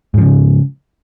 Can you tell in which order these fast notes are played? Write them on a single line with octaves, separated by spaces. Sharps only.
G#2 F3 C#3